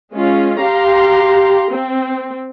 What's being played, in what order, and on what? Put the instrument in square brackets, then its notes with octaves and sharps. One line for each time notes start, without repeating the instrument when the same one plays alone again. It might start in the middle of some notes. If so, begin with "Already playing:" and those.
[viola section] G#3 C#4 F4
G4 F5 A#5 C6
C4